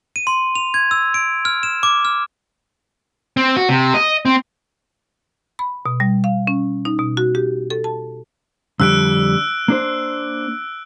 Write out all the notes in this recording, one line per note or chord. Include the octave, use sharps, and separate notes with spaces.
D#7
C6
F7
G#6
E6
D7
F6
E7
D6
F6
C4
F#4
C3
D#5
C4
B5
B2
G3
F5
C#4
D#4
B2
F#4
G4
A4
A5
F2 D3 G3 E6 F#6 D7
A#3 D4 C5